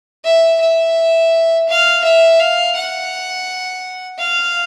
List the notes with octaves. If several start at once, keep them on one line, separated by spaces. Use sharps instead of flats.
E5
E5
F5
E5
F5
F#5
F5